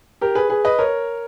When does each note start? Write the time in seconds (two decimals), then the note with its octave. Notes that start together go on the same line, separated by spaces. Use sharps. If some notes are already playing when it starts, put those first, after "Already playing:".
0.21 G4 A#4
0.35 G#4 B4
0.50 G#4 B4
0.65 B4 D#5
0.79 A#4 C#5